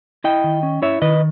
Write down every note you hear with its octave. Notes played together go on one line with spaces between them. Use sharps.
E4 D#5 G5
D#3
C#4
E4 C#5 E5
D#3 B4 D#5